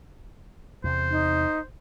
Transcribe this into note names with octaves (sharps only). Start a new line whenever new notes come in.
E2 C3 C5
D#4